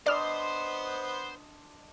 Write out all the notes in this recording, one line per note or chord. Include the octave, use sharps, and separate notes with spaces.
B3 D4 C5 D5 D#5 C6 F6